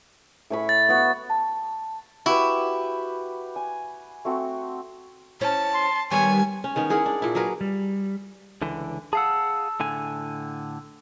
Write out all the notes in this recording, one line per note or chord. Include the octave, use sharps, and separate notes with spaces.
A2 C#5 B5
A6
B3 F#4
A5
E4 F#4 G4 B4
G#5
A3 C4 F#4
C#4 E4 C5 A5
C6
D#3 G3 B3 C#5 G#5
C#4
D#3 B3 C#4
E4 G#4 A#4 F#5
D4
A#2 E4
F#3 G#4 A#4 B4
G3
C#2 D3 E3
G#4 F5 F#5 A5 E6
A2 D3 G#5